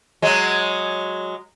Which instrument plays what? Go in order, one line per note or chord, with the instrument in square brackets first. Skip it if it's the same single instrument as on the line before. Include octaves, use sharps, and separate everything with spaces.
[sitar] F#3 G#3